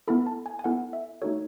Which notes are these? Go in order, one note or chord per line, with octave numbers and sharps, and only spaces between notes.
B3 E4 A4 B5
A5
G#5
G#5
B3 E4 A4 F#5
E5
A3 D#4 F#4 A4 C#5